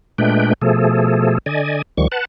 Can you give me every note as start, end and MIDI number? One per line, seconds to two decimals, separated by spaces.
0.18 0.53 46
0.18 0.53 56
0.18 0.53 57
0.18 0.53 62
0.18 0.53 71
0.18 0.53 79
0.62 1.38 47
0.62 1.38 53
0.62 1.38 57
0.62 1.38 68
0.62 1.38 69
1.46 1.82 50
1.46 1.82 74
1.46 1.82 75
1.46 1.82 80
1.98 2.08 38
1.98 2.08 51
1.98 2.08 53
1.98 2.08 55
1.98 2.08 85
2.12 2.25 71
2.12 2.25 78
2.12 2.25 81